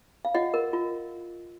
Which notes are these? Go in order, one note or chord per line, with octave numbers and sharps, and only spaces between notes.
F5
F4 D#5 F#5
A#4
F4